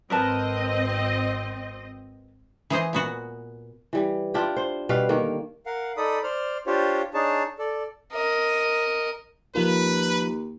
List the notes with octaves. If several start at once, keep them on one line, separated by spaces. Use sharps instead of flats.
G#1 C4 A#4 B4 D#5 A5
E3 G#4 C5 D#5
A#2 B3 F#4
E3 G3
D4 E4 F4 G4
C5
B2 G3 B4 F5
D3 D#3 A#3
A#4 F5 F#5
D#4 A4 D5 B5 D#6
C5 D5 F6
D4 F4 G4 C5 C#5
D4 D#4 G#4 C#5 A5
A4 D5
A#4 D#5
D#2 F3 F4 A#4 B4